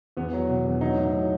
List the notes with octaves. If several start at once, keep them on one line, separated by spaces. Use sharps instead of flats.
E2 B3
F#3
B2
E2
F#3 D#4
A2
F#3